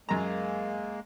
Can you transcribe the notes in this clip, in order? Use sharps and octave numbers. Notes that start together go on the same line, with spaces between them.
F#2 G#3 A#3 A#5